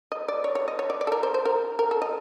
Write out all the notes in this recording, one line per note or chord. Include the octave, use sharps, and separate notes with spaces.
D#5
D5
C#5
C#5
D#5
C#5
D5
D5
A4
A#4
C5
C5
A#4
A#4
A4
D#5